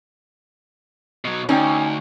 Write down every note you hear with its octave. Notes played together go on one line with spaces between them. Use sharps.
B2 F#3
D2 C#4 D#4 G5